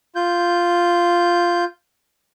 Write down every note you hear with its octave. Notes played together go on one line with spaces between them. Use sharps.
F4 G6